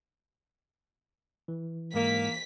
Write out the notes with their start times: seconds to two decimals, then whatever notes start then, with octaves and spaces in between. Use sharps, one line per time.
1.48 E3
1.94 G#2 A#3 B6